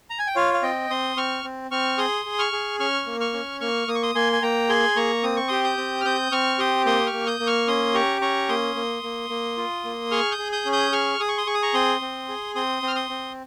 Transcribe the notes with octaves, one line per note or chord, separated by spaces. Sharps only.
A#5
G#5
G5
F4 C#5 F5
F5
C4 D#5 G5
C4 C6 D#6
C4 C#6 F6
C4
C4 C#6 F6
G#4 C6 D#6
G#4
C#6 F6
G#4
C#4 C#6 F6
A#3
C#6 F6
C#4
A#3 C#6 F6
A#3 D#6
C#6
C6 D#6
A#3 G#5 C6
G#5
A#3 G5 A#5
G#4 G#5 C6
A#3 A#5 C#6
C4 D#6
C#6
G4 C6 D#6
D#6 G6
C4
F6
C4 D#6 G6
C4 C#6 F6
G4 C6 D#6
A#3 C6 D#6
C#6 F6
A#3
D#6 G6
A#3
C#6 F6
C#4 C6 D#6
G4 A#5 C#6
C#4 A#5 C#6
A#3 C6 D#6
A#3
A#3
A#3
F4
A#3
G#4 C#6 F6
D#6 G6
G#4
D#6 G6
C#4
D#6 G6
G#4 C#6 F6
G#4 D#6
C#6
C6 D#6
G#4 C#6
D#6
A#5 C#6
C4 C6 D#6
C4
G#4
C4 C6 D#6
C4 F6
C6 D#6
C4